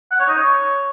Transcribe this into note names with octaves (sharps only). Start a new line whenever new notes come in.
F#5
C#5
D#4
C#5